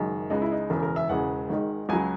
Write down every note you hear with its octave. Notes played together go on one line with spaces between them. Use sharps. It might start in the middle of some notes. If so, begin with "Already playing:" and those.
Already playing: F#1 F#2 D#3 G#3
C#2 C#3 G#3 D#4
E4
D#4
E1 E2 C#3 A#4
A#4
E5
E1 E2 C#3 G#3 F#5
G#1 G#2 D#3 G#3
C#2 C#3 F#3 G#5